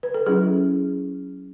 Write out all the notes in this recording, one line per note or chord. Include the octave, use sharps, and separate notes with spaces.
B4
A4
F#3 C#4 E4 G#4